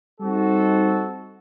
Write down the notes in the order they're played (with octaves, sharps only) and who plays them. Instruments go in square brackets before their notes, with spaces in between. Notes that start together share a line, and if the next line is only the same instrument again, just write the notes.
[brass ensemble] G3 C4 D#4 F#4 A4